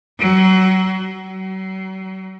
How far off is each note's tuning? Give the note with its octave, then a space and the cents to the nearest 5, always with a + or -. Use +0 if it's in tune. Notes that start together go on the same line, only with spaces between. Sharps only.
F#3 +35
F#3 +40